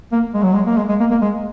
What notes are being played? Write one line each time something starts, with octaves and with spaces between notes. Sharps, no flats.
A#3
G#3
F#3
G#3
A#3
G#3
G#3
A#3
A#3
G#3